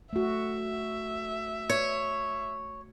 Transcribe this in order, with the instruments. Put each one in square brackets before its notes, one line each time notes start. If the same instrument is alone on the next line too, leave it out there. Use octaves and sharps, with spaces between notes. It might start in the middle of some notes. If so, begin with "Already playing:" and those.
[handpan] A3 F#4 [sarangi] E5
[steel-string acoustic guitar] C#5